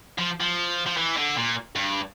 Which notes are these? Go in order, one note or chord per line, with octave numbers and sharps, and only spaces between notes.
F3
F3
F3
E3
D3
A#2
G2